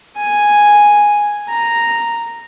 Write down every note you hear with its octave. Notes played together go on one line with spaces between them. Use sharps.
G#5
A#5